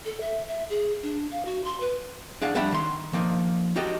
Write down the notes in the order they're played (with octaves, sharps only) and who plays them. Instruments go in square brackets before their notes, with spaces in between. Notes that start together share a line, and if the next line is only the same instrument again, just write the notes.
[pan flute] A4
E5
E5
G#4
D4
F5
F#4
C6
B4
[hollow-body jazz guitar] D4 G#4 F5 F#5
F2 G3 D4 E5 F#5 B5
D#3 C6
F3 A#3 D#4
D#4 F#4 G4 A4 D#5